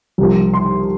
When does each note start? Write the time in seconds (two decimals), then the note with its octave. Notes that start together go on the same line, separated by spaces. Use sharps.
0.18 C2 C3 F3
0.54 C6